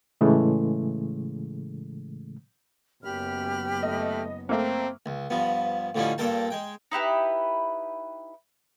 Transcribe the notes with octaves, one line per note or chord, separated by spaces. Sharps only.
A2 C#3 E3 G#3 A3
F#1 F#2 B3 G4 B5 F6
A3 D#5
A3 A#3 C4
C#2
G2 F3 B3
A2 D3 F3 G3 C#4 D#4
G2 A#2 A4 A#4 G5 A5
G#3 G5
D#4 E4 G4 B4